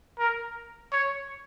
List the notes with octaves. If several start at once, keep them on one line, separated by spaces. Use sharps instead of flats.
A#4
C#5